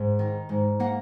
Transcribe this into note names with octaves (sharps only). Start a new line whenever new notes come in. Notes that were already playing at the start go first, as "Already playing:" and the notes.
Already playing: G#2
D#3
G#2
A#3 F#5